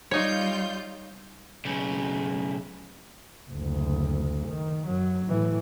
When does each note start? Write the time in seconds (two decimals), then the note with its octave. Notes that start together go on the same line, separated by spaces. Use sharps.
0.11 G3 D#4 F4 C#5 G6
1.65 B1 C#3
3.49 F#1 D2
4.47 D#3
4.87 F#2 F#3
5.26 A2 E3